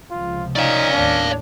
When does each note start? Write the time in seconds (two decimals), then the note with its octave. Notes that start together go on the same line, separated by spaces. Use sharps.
0.10 C#2 C3 F3 F4
0.56 C#4 D#4 D5 F5
0.93 D#2 A2 D4